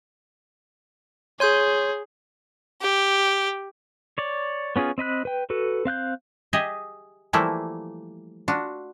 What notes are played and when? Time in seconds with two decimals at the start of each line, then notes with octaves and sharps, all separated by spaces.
1.40 G#4 C#5 C6 G6
2.81 G4
4.18 C#5 D5
4.76 B3 C#4 F4 G#4
4.98 C4 D#5 B5 F#6
5.25 B4 G5
5.50 F#4 A4 B4
5.85 C4 F5 F#6 G6
6.53 G4 G#4 D#5 E5
7.33 E3 F3 G3 A3 A#3 E4
8.48 D4 F4 F#4